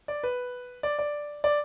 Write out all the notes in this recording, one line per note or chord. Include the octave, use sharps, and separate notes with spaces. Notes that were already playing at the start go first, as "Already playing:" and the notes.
D5
B4
D5
D5
D5